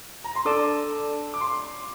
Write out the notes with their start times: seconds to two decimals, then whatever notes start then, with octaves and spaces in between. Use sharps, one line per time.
0.24 A#5
0.36 C6
0.45 D4 A4 D5 A5 D6
1.34 D6
1.41 C6